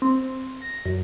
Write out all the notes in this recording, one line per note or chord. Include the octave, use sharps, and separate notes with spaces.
C4
A#6
F#2